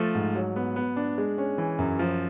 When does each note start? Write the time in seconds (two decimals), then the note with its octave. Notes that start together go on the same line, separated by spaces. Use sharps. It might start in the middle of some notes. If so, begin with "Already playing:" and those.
Already playing: F3 A3
0.15 G#2
0.35 F#3
0.56 B3
0.76 B3
0.96 D4
1.18 G#3
1.38 C#4
1.58 E3
1.79 F#2
1.99 F3